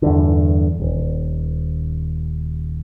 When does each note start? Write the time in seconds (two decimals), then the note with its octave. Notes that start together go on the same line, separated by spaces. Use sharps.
0.02 E2 G2 D3
0.80 D#1